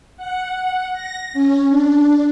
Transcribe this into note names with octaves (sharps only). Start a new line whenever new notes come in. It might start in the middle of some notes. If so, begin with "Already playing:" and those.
F#5
A#6
C#4
D4